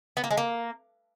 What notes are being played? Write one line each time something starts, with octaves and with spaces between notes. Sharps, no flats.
B3
A#3
G#3
A#3